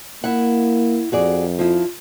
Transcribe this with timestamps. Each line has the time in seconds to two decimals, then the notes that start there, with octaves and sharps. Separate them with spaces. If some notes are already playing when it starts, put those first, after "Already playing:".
0.24 A#3 E4 F#5
1.12 F2 F#4 G#4 D5
1.59 F3 E4